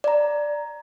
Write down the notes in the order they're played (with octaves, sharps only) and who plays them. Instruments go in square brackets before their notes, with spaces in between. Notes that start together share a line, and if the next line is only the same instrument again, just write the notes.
[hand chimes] D5 A#5